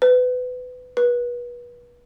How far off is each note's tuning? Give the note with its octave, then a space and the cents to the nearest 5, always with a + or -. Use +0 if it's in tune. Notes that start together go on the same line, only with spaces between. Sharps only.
B4 +25
B4 -30